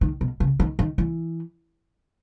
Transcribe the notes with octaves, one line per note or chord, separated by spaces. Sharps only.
D#3
B2
C#3
D#3
D#3
E3